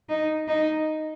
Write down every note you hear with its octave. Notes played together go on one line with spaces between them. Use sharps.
D#4
D#4